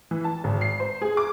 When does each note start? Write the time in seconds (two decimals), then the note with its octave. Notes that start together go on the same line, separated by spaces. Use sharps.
0.11 E3
0.24 A5
0.44 G#1
0.61 C7
0.80 C5
1.02 G#4
1.17 D6